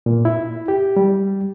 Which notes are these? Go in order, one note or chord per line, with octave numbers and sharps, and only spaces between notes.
A#2
E4
G4
G3